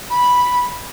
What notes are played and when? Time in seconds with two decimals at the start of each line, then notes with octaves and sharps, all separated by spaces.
0.10 B5